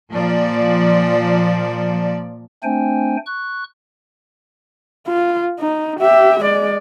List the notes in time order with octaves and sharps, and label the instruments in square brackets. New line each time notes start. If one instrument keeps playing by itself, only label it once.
[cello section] A#2 F3 D5
[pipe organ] A3 C4 D4 C5 G5 G#5
C#6 F#6
[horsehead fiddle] F4
D#4
G4 E5
G#3 D5